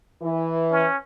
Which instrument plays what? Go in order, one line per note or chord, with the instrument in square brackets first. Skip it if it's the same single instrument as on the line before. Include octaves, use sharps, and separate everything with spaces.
[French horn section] E3
[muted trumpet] C#4